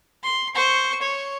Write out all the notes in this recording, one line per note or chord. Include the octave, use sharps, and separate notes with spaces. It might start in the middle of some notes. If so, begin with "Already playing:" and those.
C6
C5 C#6
C#5